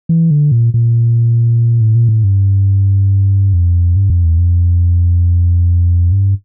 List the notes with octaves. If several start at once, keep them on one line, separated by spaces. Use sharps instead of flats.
E3
D3
A#2
A#2
A2
A#2
A2
G2
F2
G2
F2
E2
F2
G2